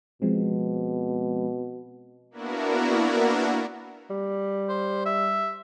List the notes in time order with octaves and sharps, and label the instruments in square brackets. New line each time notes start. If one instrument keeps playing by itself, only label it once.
[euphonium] B2 [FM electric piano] F3 G#3 C4
[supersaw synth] A#3 B3 D4 E4 F#4 A#4
[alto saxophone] G3
[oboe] C5
E5